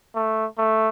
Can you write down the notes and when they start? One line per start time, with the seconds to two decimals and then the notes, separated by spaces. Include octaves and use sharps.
0.15 A3
0.58 A3